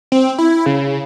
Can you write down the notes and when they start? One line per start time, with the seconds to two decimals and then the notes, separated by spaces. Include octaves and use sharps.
0.12 C4
0.38 E4
0.66 C#3